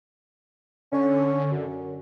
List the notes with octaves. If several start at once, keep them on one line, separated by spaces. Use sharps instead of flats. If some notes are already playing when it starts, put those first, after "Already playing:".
D3 C#4
F#2